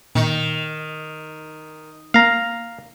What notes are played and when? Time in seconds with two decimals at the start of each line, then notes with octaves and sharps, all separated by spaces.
0.15 A#2 D#3
2.14 A#3 F5 A#5